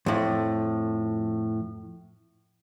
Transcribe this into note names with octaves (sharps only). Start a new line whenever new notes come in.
F2 A2